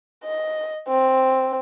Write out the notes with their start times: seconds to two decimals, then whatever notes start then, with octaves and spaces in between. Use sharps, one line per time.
0.24 D#5
0.89 C4